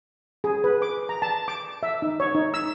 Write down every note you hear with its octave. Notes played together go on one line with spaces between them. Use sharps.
G#4
B4
D6
A#5
A5
D6
E5
D#4
C#5
D#4
E6